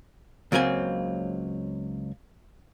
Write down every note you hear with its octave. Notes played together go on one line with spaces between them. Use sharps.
C#2 F#3 A#3 C4 G#5